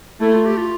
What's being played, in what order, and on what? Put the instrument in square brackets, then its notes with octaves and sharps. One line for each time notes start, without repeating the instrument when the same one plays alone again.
[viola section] A3 [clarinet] E4
[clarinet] F4
G4
F4